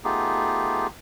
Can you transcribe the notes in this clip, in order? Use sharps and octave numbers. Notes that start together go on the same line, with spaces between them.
A3 B3 D#4 F4 G4 G#4